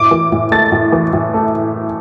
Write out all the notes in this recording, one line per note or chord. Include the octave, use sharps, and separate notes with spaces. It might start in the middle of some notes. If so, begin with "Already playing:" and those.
Already playing: A2 D6
E3
A2
A3 A6
A2
E3
A2
A3